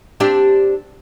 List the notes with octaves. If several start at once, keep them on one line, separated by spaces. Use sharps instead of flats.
C4 D4 G4